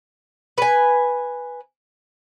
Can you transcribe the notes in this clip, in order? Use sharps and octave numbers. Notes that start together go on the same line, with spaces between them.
B4 G#5